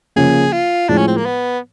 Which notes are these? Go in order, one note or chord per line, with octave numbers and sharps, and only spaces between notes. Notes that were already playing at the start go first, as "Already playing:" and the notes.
C#3 F3 A#3 C#4 G#4
F4
A2 F3 G#3 D4
C#4
C4
A#3
B3